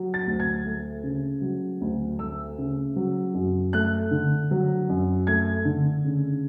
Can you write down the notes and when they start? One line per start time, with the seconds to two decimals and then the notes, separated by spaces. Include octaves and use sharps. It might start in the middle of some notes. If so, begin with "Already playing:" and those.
Already playing: F#3
0.14 A6
0.27 D2
0.40 G#6
0.66 A3
1.03 C#3
1.42 F#3
1.81 D2
2.19 A3 E6
2.58 C#3
2.96 F#3
3.34 F#2
3.73 A3 F#6
4.11 D3
4.51 F#3
4.89 F#2
5.27 A3 G#6
5.65 D3
6.05 C#3